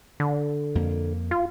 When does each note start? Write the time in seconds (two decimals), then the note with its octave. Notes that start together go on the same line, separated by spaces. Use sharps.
0.20 D3
0.75 F2 A#3
1.31 F4